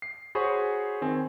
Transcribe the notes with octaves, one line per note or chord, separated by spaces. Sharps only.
C7
F#4 G#4 C5 C#5 B5 C#6
D#3 C4 G#5